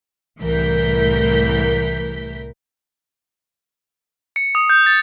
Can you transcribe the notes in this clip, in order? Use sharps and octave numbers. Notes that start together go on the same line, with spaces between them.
C2 A2 E3 A#4 G6 B6
C#7
D#6
G6
A6